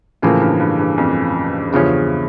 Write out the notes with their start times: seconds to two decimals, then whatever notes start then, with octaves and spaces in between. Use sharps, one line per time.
0.22 A2 C#3 E3 F3 A#3
0.41 G2
0.60 G2
0.79 G2
0.98 F2
1.73 E2 G2 C#3 F3 C#4